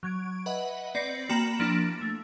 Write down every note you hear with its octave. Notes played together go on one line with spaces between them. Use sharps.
F#3 G#6 D7
B4 D#5 E5 F#5 B5
C4 D5 B5 A#6 C7 C#7
A#3 F#4 G5 A#5 B5 E7
F3 A#3 D4 E4
A3